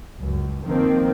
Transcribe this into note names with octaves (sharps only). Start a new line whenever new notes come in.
C#2 F#2
D#3 F3 A#3 C4